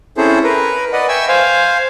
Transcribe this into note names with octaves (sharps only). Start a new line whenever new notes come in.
C4 C#4 E4 G#4 A4 C5
A#4 B4
B4 D5 D#5 F#5
E5 G5 G#5 C#6 E6
C5 F5 G#5